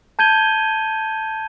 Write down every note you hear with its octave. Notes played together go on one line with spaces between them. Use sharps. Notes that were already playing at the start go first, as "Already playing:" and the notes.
A5 G6 G#6 D#7 G7